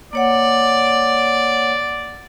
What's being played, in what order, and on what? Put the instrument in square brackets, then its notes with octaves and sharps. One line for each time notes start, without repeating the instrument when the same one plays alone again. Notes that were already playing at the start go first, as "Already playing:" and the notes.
[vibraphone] A#3 C#5 F#5 [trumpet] D5